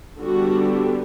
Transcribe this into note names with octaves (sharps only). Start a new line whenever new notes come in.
D3 G3 B3 D4 F#4